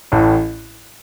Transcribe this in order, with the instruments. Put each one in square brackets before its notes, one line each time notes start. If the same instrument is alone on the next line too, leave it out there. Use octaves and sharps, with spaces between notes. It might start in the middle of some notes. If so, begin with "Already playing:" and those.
[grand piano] A1 A2